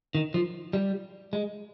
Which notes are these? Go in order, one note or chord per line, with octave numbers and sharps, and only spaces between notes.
D#3
F3
G3
G#3